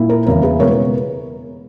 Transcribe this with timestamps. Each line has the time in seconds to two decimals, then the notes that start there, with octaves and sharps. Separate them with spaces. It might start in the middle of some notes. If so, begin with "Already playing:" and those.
Already playing: A#2 A#3 E4
0.09 A#4
0.26 E2 C#3 E3 A#4
0.43 G#4 B4
0.60 B2 G#3 B3 A#4 C#5
0.71 A#4